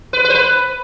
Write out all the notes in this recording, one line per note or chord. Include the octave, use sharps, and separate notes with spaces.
B4
B4
C5
B4